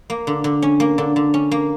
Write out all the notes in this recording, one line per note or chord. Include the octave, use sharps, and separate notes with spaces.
A#3
D3
D3
C#4
A#3
D3
D3
C#4
A#3